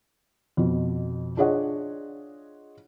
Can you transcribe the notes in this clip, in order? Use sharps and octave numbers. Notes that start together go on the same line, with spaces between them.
F2 B2
D4 F4 G#4 C#5 D#5 F#5